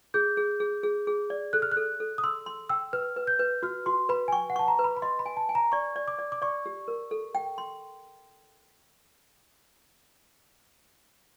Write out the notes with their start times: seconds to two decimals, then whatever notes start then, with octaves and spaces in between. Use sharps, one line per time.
0.14 G#4 G6
0.37 G#4
0.60 G#4
0.83 G#4
1.07 G#4
1.30 D5
1.53 A4 F#6
1.62 F6
1.72 F#6
1.77 A4
2.00 A4
2.18 D#6
2.24 C6 E6
2.46 C6
2.70 G5 E6
2.93 B4 F6
3.16 B4
3.27 G6
3.39 B4
3.63 F#4 F6
3.86 F#4 C6
4.09 B4 B5
4.28 G#5
4.32 G5 C#6
4.50 F#5
4.56 A5 C#6
4.68 A#5
4.79 B4
4.84 B5
4.97 B5
5.02 D#5 C6
5.19 B5
5.26 G#5
5.37 A5
5.49 G#5
5.55 A#5
5.72 D5 C#6
5.96 D5
6.08 D6
6.19 D5
6.32 D6
6.42 D5 C#6
6.66 G4
6.88 A#4
7.11 A4
7.35 G5
7.58 C6